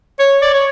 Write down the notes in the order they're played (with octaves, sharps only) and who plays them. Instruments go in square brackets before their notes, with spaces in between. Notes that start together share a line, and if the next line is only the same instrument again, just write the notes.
[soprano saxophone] C#5
D5
C#5